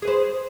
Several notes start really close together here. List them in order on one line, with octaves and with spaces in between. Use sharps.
G#4 B4 C5